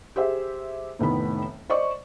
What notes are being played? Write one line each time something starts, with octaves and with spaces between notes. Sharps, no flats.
G4 G#4 C5 E5
F1 A2 D#3 B3 B5
C5 D5 D#5 C#6